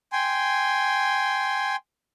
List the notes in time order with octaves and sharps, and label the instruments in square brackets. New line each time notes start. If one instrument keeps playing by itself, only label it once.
[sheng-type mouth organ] G5 G#5 C6